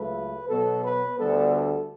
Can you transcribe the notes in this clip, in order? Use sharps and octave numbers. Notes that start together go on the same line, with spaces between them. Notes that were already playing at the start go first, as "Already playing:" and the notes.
Already playing: C#2 C#3 F#3 A3 B4
B2 F#3 B3 A4
B4
D2 D3 G3 B3 A4
A4